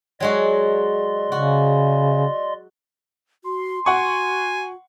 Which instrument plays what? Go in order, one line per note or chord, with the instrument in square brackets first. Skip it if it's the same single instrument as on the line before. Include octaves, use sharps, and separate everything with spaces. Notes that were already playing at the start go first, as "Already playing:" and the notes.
[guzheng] F#3 G#3 F#4 [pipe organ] D5 D#5 C6
[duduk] C#3 [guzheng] F#4
[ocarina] F#4 [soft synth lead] C6
[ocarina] F#4 [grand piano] F#5 C#6 [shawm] G#5